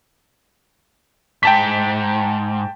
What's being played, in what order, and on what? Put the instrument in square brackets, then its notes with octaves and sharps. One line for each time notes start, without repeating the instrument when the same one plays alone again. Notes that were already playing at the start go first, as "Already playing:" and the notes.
[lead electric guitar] G#2 [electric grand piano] G5 A5 B6